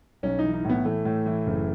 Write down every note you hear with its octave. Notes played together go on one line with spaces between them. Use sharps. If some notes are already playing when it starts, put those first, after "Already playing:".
B1 C#4
D#4
E3
D#4
A2 B3
E3 A3
A2
E3
F#1